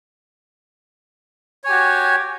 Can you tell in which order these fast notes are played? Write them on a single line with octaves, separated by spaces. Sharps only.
C#5 G#5 G4 F#4